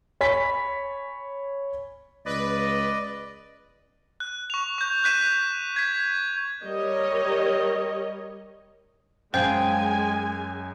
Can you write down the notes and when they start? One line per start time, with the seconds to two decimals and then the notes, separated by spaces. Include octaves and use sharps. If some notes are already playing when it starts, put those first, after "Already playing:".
0.21 C#5 G#5 B5 B6
2.26 C#2 B4 D5 D#5
4.20 F#6
4.50 C#6 F7
4.78 C#6 G6
5.04 F#6 G6 B6 D#7 E7
5.76 G#6 B6
6.64 G3 A#4 C#5 D#5
9.34 F#2 G#3 C5 F5 G5 G#5